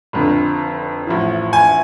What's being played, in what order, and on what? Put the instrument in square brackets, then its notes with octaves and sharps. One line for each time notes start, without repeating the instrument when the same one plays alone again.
[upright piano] F1 F2 D3
A1 A2 F3
G#5